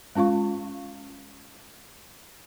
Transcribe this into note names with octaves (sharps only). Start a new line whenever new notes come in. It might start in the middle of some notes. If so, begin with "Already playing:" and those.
G#3 C#4 F4 F5 C#6